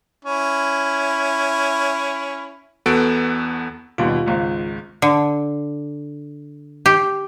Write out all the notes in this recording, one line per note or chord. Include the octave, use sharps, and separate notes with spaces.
C#4 E4
E2 B3 F#4 A4 D7
D#2 B2 G3 F4
G#1 C#2
D3
G4